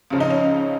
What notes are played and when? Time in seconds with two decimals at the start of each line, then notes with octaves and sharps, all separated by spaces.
0.10 C#2 C#3 F3
0.20 D#4
0.30 C#4